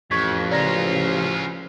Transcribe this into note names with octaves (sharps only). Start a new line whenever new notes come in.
A1 F2 C#6 G#6 B6
C#3 F3 C#4 F4 D5 A#5 A#6